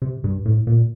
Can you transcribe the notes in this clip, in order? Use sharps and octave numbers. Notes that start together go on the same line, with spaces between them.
C3
G2
A2
A#2